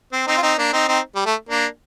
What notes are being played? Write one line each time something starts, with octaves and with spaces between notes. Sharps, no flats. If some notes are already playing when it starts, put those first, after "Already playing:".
C4
C4 D#4
F4
C4 D#4
A#3 D4
C4 D#4
C4 D#4
G3
A3
A#3 D4